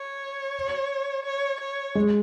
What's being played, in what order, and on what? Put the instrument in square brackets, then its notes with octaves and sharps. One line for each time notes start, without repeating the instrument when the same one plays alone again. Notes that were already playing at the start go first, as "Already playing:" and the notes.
Already playing: [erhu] C#5
C#5
C#5
[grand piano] G#3